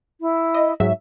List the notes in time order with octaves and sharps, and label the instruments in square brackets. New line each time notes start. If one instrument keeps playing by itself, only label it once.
[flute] E4
[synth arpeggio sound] D#5
G#2 F#3 E5